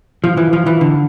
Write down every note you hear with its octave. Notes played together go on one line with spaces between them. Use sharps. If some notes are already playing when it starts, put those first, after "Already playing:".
F3
E3
F3
E3
D3